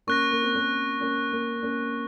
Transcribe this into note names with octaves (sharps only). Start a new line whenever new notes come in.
A#3 C#4 C#6 F#6 A#6
A#3
C4
A#3 C#4
A#3 C#4
A#3 C#4
A#3 C#4